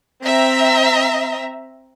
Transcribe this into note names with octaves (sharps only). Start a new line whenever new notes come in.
C4 E5 A#5